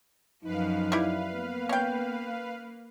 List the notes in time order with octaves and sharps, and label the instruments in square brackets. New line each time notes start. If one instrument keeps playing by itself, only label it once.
[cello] F#2 F3 [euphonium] D#4 [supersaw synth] B4 F5
[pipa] G3 E4
[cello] A#3 [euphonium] B3
[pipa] C#4 G5